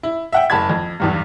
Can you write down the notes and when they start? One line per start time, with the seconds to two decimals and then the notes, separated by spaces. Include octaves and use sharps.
0.03 E4
0.32 E5 F#5 G5
0.50 F#1 A5 B5 G#6
0.70 F2
1.00 B1 E2 G2